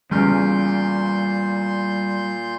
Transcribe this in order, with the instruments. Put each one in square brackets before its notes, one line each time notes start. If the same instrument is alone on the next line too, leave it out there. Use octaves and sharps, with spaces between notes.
[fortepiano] E2 C#3 F6 [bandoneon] A#2 C6 G6 [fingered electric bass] G3